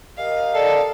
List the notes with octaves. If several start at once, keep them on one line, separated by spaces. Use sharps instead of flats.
G4 A#4 D#5 F5
A4 D5